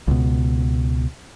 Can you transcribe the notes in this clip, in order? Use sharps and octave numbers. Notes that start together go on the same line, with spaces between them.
C#2 B2